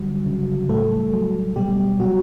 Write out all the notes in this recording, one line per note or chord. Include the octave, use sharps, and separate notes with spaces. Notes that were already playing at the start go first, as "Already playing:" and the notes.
Already playing: D3 F#3 G3 F#4
C#3
A2 A3 A4
F#3
B2 G3 G4
B2 F#3 F#4